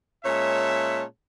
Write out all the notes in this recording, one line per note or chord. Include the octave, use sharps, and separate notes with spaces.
A#2 G#3 C#4 C#5 E5 A5